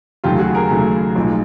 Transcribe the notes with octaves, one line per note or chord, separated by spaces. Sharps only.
D#2 C#3 F#3 A3 F4 G4
F#4 G#4
G#4 A#4
D#2 C#3 F#3 A3
B1 A2 F3 G#3